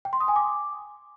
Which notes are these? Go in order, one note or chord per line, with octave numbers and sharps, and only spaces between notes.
G5
C6
D#6
G#5
D6